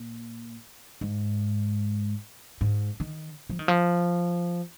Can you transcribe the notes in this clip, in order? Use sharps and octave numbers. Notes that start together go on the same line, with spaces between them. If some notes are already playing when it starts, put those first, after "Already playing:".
Already playing: A#2
G#2
G#2
D#3
F3
D#3
F3